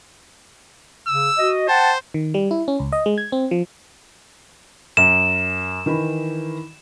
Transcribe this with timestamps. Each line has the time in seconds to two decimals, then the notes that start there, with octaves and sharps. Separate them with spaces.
1.07 C#3 E6
1.37 F#4 D#5
1.68 C5 F#5 G5 A5
2.14 D#3
2.34 G3
2.51 E4
2.68 C#4
2.79 C#2
2.93 D#5
3.06 G#3
3.18 G#6
3.32 C4
3.51 F3
4.97 F#2 E7
5.86 D#3 E3 B5